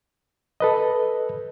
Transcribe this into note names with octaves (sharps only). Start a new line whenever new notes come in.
A4 B4 D#5